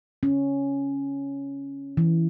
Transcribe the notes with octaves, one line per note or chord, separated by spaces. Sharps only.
C#4
E3